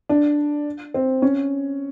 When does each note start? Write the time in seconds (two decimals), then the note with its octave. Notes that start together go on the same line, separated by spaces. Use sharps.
0.09 D4
0.94 C4
1.22 C#4